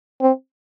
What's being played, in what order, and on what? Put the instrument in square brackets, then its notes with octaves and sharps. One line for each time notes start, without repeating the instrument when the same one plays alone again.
[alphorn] C4